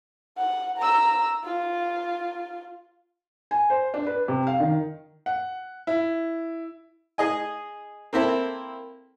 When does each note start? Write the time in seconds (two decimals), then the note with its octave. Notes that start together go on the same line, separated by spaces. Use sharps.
0.37 F#5
0.78 A#5 E6
1.44 F4
3.51 G#5
3.70 C5
3.94 D4
4.07 B4
4.28 C3
4.47 F5
4.60 D#3
5.26 F#5
5.87 E4
7.18 G#4 D#5 G#5
8.13 A#3 C4 E4 A4